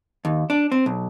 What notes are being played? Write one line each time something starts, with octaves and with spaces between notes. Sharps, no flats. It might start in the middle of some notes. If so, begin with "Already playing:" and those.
D#2
D4
C4
B1